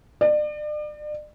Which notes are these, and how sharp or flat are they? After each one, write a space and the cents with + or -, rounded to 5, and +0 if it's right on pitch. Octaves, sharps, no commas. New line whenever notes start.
D5 +35